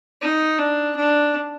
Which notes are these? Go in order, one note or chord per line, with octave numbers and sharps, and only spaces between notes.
D#4
D4
D4